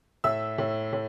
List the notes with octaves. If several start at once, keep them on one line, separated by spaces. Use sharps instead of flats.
A2 E5 E6
A2
A2